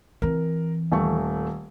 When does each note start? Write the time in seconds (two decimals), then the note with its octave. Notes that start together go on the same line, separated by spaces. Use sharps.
0.22 E3 C4 A#4
0.92 D#1 A3 C#6